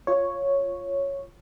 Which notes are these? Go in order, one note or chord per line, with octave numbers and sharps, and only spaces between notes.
F4 C#5